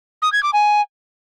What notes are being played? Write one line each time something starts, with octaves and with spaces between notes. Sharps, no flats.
D#6
G#6
D6
G#5